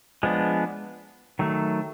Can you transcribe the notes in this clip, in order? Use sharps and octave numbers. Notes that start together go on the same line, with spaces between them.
F3 G#3 B3 D4
D#3 F#3 A3